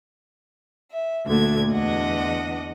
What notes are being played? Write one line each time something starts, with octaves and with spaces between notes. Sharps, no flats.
E5
D2 A#2 D3 G#6
E2 D4 D#5 F#5